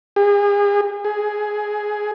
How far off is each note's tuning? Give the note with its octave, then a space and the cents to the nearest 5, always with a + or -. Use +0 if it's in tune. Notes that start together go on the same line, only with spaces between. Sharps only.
G#4 -40
G#4 +10